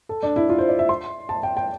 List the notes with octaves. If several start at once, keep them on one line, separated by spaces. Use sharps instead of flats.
A4
D4
E4
F4
C5
D5
E5
C6
A5
G5
G5